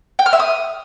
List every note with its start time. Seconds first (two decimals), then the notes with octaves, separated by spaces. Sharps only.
0.19 G5
0.26 F6
0.33 E5
0.40 D#6